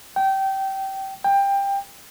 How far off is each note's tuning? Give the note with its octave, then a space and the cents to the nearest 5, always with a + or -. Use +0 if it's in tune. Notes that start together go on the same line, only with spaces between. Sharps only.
G5 -20
G5 +20